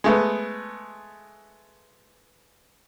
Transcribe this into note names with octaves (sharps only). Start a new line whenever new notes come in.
G#3 A3 B3